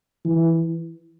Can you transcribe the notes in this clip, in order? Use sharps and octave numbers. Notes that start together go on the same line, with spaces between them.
E3